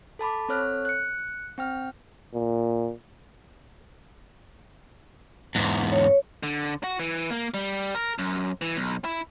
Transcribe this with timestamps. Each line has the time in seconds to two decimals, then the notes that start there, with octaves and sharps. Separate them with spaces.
0.19 A4 A5 B5 D6
0.49 C4 A4 C#5 F6 F#6
0.85 F#6 C#7
1.58 C4 G5 F6
2.34 A#2
5.55 E2 G#2
5.92 C#5
6.43 D3
6.84 F#4
6.99 E3
7.30 A#3
7.54 G3
7.95 A#4
8.18 F#2
8.61 E3
8.76 B1
9.04 E4